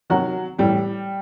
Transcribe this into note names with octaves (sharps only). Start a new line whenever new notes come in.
C3 D#3 F#3 F#4
A2 E3 G3 G4